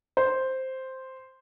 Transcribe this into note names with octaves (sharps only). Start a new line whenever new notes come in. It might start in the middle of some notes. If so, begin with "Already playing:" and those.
C5